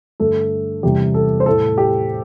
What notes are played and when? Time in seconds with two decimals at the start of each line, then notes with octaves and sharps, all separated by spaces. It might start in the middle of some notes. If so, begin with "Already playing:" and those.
0.20 G2 D3 A3 A4
0.83 E2 C3 E3 G3 G4
1.14 A4
1.40 C5
1.46 A2 A3 A4
1.78 G4